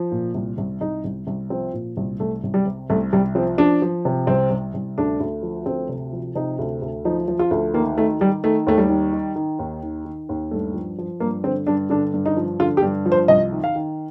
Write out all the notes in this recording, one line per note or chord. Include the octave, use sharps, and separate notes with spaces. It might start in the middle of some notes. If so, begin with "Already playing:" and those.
Already playing: F3
A#2
C2
C2
C2 D#4
C2
C2
F3 C4
A#2
C2
C2 A3
C2
G3
C3
C2 A3
C2 G3
F3 C4
F3 D4
F3
C3
C2 C4
C2
C2
D2 D4
D2
F3
D2 C4
C3
F3
C3 D#4
D2
D2
F3 D#4
F3
F4
D2
D#3 A#3
D#3 A3
D#3 G3
D#3 A3
D#2 A3
G3
D#3
D#3
D#3
D#2
D#3
D#3
D#2
G2 A3
F3
F3
G2 A#3
D3 C4
G2 D4
D3 D4
G2
D#4
F3
D3 F4
G4
G2
F3
C5
C2 D#5
D#3
F5
D#3